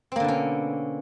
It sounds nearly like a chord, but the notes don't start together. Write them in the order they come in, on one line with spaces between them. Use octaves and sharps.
C4 A#3 D3 B2 C#4